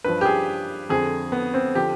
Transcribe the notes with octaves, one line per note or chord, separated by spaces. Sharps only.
G2 F3 B4
G4
G#4
F2 D3 F3 G#4
B3
C4
D3 F3 G4